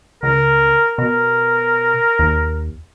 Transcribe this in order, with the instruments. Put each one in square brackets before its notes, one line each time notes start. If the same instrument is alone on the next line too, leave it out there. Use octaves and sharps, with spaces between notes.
[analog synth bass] C#2 [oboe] A#4
[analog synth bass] B2 [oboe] A#4
[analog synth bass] D#2